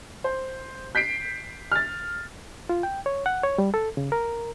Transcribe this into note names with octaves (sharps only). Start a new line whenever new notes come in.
C5
G6 B6 C7 D7
F6 A6
F4
G5
C#5
F#5
C#5
G3
A4
C#3
A#4